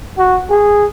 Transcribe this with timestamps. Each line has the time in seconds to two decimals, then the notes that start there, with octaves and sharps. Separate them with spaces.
0.18 F#4
0.50 G#4